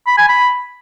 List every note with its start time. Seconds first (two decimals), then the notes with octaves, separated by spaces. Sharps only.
0.07 B5
0.18 G#5
0.28 B5